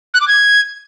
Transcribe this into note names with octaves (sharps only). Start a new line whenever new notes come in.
F#6
D6
G#6